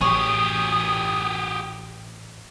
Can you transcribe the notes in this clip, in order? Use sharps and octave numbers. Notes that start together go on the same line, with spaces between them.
A1 G4 G#4 C#5 D#6